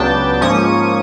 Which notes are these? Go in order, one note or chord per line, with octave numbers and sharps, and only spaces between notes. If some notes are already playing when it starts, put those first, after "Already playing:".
Already playing: C#2 C#3 F#3 B3 D4 G5 A5
G#2 F3 A#3 C#4 C#6 D#6